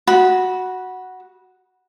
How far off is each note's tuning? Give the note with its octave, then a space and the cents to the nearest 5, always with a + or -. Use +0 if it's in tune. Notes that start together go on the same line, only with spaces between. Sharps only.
F#4 +0 B5 -25